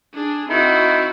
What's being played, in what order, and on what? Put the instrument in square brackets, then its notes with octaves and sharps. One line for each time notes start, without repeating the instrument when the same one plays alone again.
[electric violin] D4 G#4
[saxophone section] D#3 D#4 E4 [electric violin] C4 F#4